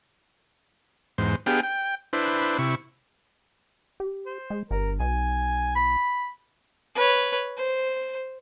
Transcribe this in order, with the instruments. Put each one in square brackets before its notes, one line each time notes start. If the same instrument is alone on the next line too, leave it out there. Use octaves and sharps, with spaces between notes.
[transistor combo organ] E2 G#2 C5
B3 D4 G4 G#4 F5 G5
G5
D4 E4 B4 C5
C3 E4 C#6
[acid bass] G4
[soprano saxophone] C5
[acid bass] G#3
[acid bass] G1 [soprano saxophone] A#4
[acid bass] B1 [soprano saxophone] G#5
[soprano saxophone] B5
[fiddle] B4 C#5
C5